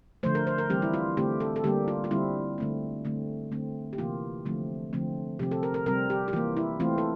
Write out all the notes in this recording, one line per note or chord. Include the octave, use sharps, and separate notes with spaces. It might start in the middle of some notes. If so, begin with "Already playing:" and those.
D3 F3 A3 C5
A#4
C5
A#4
E3 G3 C4 G4
E4
F4
D3 A3 C4 G4
A4
A4
D3 G3 A#3 G4
F4
F4
D3 G3 C4 E4
D3 A3 C4
D3 A3 C4
D3 A3 C4
G4
C3 E3 A#3 F4
D3 F3 A3 C4
D3 F3 A3 C4
C3 F3 C4 G4
A4
A#4
A#4
C3 G3 C4 A#4
G4
G4
E3 A#3 F4
E4
E3 A3 C4 F4
A4